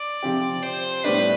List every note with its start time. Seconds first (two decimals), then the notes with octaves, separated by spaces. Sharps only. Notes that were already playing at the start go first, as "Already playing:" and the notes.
Already playing: D5
0.23 C3 F3 C4 G4
0.63 C5
1.04 A2 G3 B3 D4 B4